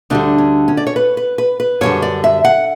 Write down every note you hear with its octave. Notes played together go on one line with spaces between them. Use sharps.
D2 D3 G3 D4
C#4
C#4
D5
C#5
B4
B4
B4
B4
F#2 D3 G3 C#5
D5
E5
F#5